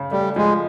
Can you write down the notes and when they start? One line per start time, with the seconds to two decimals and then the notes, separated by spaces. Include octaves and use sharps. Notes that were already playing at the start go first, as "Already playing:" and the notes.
Already playing: C#3
0.11 G3 A3
0.36 F3 G#3